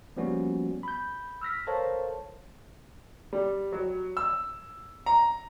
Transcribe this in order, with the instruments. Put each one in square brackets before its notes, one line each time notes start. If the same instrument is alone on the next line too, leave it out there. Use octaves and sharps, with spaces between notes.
[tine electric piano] F3 G3 A#3 B3 C#4 F#4
B5 G6
E6 F6 A#6 B6
A4 A#4 C5 C#5 F5 A5
[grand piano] G3
F#3
E6
A#5